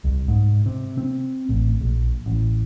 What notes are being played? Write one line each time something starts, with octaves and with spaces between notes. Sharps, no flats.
C2
G#2
C3
C4
A1
A#1
A1